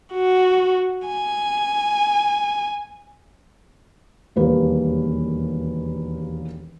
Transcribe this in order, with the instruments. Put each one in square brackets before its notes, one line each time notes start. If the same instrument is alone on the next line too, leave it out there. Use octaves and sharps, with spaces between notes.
[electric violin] F#4
G#5
[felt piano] E1 D#2 G3 A#3 B4